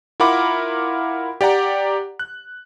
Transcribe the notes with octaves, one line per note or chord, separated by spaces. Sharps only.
E4 F4 A#4 F#5 B5 D6
G4 D5 F#5 A#5
F#6